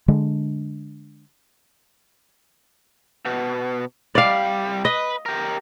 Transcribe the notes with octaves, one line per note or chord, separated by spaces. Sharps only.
D3 G#3 D4
B2
C2 G3 D5 F5
B4 D#5
G4 A#4